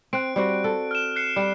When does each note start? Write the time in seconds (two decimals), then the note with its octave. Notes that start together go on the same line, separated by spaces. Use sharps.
0.13 C4 F#6 D7
0.36 G3 C4 F#4
0.64 A4
0.91 F6 E7
1.16 F#6 C7 C#7
1.36 G3